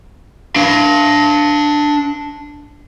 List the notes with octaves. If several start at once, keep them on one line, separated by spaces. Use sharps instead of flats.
D4 F5